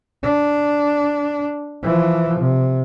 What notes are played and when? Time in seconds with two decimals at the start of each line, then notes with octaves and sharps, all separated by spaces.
0.23 D4
1.82 E3 F3
2.39 C3